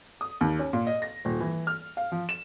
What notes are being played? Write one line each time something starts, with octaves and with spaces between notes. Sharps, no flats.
D#6
D#2
C#4
A#2
D#5
A#6
D#1
E3
F6
F5
F3
E7